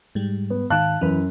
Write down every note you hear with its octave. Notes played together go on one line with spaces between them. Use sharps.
G#2 G3
B3
G#2 D#3 F5 A5 F#6
F#2 E3 B4